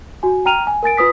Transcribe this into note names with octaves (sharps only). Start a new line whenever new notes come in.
F#4 G#5
G5 A#5 F6 D#7 F7
G#5
A#4 G#5 A6 D7
F4 B4 D#6 B6